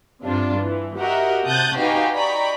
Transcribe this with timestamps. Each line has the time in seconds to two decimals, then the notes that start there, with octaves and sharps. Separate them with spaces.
0.23 G2 C3 D4 F4
0.61 E3
0.98 F#4 G4 A#4 D#5 E5 F#5
1.46 C3 A5 D#6 F#6 G6 A6
1.76 D#4 F#4 G4 B4 F5 G#5
2.13 D5 D#5 G5 A#5 B5 C#6